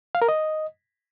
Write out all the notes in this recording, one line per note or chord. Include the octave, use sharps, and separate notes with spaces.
F5
A#4
D#5